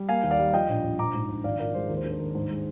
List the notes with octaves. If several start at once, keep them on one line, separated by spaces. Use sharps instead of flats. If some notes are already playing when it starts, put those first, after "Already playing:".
Already playing: G3
A#3 F5 G#5
D#2
D5 F5
G3
F3 D#5 G5
A#1
A#1
A#1 A#5 D6
G#2
A#1
G#1 D5 F5
F3 A#4 D5
G#3 C5
D#2 A#4
C5
D4 A#4
C5
D#2 A#4
G#2 C5
G#3